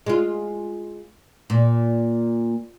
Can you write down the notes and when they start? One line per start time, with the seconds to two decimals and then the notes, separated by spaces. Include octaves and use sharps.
0.06 G#3 F4
1.50 A#2